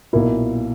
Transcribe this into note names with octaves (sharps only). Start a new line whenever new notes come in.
B1 A#2 A#3 E4